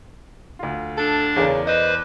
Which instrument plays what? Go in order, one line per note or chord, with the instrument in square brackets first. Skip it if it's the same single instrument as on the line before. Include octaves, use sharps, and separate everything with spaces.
[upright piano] D2 F4
[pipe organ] D4 [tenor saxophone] A4
[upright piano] E2 A#4 D5 [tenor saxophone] C#3
[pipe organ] B4 C5 [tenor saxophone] D#5